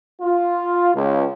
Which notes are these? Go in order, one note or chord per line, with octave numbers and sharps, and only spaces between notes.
F4
C#2